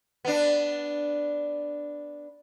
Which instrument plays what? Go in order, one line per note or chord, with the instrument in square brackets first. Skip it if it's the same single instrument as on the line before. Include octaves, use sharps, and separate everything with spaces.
[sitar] B3 D4